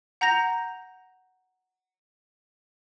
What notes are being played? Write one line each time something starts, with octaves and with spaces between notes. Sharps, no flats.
F#5 A#5 G6 A#6 F7